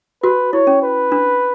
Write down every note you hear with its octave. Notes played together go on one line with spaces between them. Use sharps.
F#4 B4
E4 C#5
C#4
B4
D4